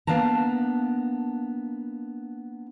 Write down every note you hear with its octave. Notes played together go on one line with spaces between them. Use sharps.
A#3 B3 D4 F5 A5 A#5